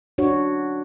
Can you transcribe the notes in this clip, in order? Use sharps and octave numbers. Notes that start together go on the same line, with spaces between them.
D4 F#4 C#5